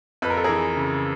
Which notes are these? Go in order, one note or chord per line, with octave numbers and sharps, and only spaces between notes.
F2 B4
A#4
A4
E3 G#4 A#4
C#3